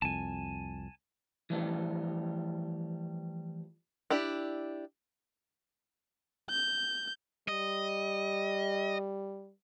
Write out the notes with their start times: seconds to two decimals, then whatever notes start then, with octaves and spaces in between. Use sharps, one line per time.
0.02 C2 F2 G#5 A5
1.50 E3 F3 G3 A3
4.10 D4 E4 G4
6.50 G6
7.48 G3 D#5